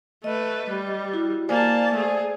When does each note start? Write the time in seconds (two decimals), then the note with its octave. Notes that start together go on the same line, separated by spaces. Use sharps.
0.24 A3 B4 D#5
0.70 G3
1.14 E4 F#4
1.49 A#3 C5 D5 G#5 A5
1.94 A3 G#4